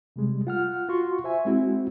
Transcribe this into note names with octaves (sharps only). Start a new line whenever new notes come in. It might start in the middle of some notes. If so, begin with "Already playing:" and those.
C3 G3 G#3
F4 F#5 F6
F4 F#4 C6 C#6
C5 E5 G#5
G#3 C4 E4 F#4